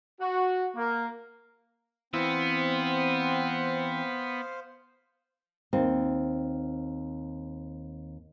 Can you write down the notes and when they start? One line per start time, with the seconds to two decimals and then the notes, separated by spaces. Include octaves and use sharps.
0.20 F#4
0.75 A#3
2.14 E3 B3 C4 C5 F5 E6
5.73 D#2 C4